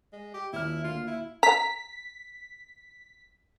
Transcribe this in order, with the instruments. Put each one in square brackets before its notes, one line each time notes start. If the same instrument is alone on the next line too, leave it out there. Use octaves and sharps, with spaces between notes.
[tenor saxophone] G#3
G4
[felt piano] D#1 F6 [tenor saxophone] E4
[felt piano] D2 A#2 F5 [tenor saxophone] F4
[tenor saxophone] E4
[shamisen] A#5 [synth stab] B6